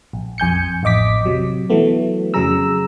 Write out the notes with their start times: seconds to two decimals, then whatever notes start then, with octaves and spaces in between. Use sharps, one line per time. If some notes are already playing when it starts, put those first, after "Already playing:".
0.13 A#1
0.38 F2 G#5 G6 C#7
0.83 A1 F2 D#5 D6 B6
1.26 C3 F#3
1.70 E3 F#3 A3 B3
2.34 F2 C#3 F#3 G#4 A#5 E6